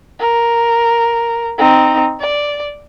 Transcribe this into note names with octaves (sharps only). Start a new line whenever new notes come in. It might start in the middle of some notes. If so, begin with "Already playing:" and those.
A#4
C4 D#4
D5